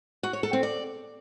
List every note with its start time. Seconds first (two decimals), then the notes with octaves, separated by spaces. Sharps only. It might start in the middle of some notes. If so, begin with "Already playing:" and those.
0.23 F#4
0.33 C#5
0.43 A4
0.53 C4
0.63 D5